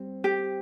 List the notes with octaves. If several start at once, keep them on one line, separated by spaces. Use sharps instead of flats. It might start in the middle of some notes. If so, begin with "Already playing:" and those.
Already playing: G3 C4
G4